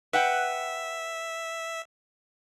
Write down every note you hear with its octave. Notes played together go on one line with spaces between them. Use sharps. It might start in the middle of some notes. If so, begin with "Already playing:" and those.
B4 E5 F#5 G5